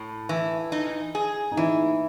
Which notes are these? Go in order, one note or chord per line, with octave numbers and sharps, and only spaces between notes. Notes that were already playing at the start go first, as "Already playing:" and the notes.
Already playing: A2
E3
D#4
G#4
D#4
E3 E4